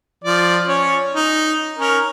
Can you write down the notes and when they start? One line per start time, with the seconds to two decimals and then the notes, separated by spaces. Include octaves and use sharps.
0.25 F3 D5
0.68 C#4 C#5
1.15 D#4
1.79 C#4 A#4 C#5